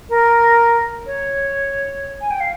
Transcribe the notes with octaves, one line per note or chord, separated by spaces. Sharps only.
A#4
C#5
G#5
G5
F5